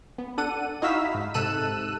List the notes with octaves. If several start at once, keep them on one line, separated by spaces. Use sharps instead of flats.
B3
D4 A4 F#5 D#7
D#4 E4 F#4 F5 E6 B6
G#2
G#2 C3 A4 E6 F#6 D#7